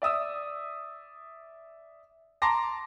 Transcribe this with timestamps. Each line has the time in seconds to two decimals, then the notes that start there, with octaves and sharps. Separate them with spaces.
0.02 D5 E5 D#6 E6
2.42 A5 A#5 C6 D6 A#6